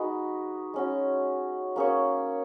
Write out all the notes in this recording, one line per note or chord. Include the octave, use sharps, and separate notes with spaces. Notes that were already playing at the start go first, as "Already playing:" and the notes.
Already playing: G#3 D#4 F#4 B4
G#3 C#4 F#4
A#3 C#4 G#4 C#5